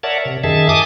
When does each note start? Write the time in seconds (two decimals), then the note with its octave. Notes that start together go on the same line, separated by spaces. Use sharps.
0.03 A#4 C#5 D5 E5 F#5 A5
0.25 C3
0.44 F#2 D#3 G#4 E5 A5
0.69 G#5 A5 D6 D#6